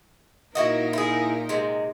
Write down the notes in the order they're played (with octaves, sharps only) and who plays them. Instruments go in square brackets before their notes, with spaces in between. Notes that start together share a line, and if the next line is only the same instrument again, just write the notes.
[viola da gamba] A#2 D#4 A#4 [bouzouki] E4 F#4 D#5
[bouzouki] E4 G#4
C3 G#3